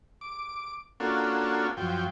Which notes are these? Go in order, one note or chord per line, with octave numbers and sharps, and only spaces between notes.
D6
A#3 C#4 D4 F4 F#4 A4
F#2 F3 G5